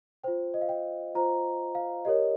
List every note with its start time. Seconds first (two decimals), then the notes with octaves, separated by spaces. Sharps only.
0.24 F4 C5 G5
0.54 D#5
0.62 F5
0.69 G5
1.15 F4 C5 A#5
1.75 F5
2.05 G4 A#4 C#5 D#5